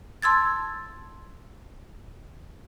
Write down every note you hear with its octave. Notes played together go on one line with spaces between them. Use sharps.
A5 C6 E6 G#6 A6